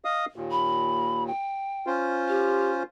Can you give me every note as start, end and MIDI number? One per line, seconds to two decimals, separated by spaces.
0.04 0.26 75
0.04 0.26 77
0.04 0.26 87
0.36 1.31 39
0.36 1.31 46
0.51 1.25 83
1.27 1.90 79
1.87 2.83 61
1.87 2.83 65
1.87 2.83 72
2.28 2.70 67